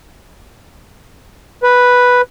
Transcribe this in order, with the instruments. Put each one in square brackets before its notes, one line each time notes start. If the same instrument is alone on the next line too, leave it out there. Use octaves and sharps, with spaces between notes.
[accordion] B4